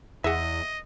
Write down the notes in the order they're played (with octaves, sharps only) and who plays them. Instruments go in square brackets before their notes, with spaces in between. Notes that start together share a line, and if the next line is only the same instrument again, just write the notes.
[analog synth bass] E2 [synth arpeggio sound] E4 G#4 [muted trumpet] D#5 [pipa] E5 F#5